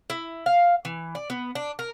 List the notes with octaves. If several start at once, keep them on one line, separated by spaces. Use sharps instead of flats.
E4
F5
E3
D5
B3
D4
A#4